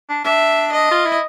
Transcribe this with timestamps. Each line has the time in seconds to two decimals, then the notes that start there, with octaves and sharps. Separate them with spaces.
0.09 D4
0.25 D4 E5
0.72 D#5
0.91 F4
1.05 E4